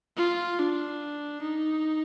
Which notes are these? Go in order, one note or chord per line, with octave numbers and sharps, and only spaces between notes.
F4
D4
D#4